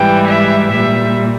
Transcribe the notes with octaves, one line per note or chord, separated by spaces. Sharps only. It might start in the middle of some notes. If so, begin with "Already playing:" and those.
Already playing: G#2 E3 G3 G5
E5
A#2 G3 E5